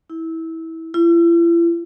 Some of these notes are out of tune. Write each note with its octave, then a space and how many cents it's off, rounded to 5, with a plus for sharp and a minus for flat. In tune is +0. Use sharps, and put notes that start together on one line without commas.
E4 -20
E4 +45